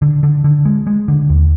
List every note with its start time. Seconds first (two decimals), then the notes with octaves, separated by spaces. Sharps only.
0.02 D3
0.23 D3
0.44 D3
0.65 G#3
0.87 G#3
1.08 D3
1.30 D#2